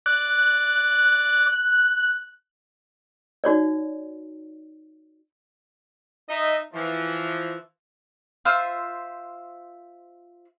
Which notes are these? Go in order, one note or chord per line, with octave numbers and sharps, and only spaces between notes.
D5 D6 F#6
D#4 F#4 C#5 D5
D#4 D#5 E5
E3 F3
F4 C5 E5 E6